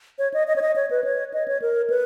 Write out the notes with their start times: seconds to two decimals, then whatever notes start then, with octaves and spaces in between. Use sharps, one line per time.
0.19 C#5
0.34 D#5
0.48 D#5
0.56 C#5
0.62 D#5
0.76 C#5
0.91 B4
1.04 C#5
1.34 D#5
1.48 C#5
1.62 A#4
1.90 B4